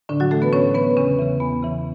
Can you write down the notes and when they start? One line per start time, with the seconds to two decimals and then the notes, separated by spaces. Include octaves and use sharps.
0.09 A2 D3 D4
0.20 F#3 F#4
0.31 E3 A3 A4
0.42 B3 B4
0.53 A2 C#4 C#5
0.75 E3 B3 B4
0.97 E2 C#3 C#4
1.19 C#3 E3
1.40 E2 B3
1.63 C#3 E3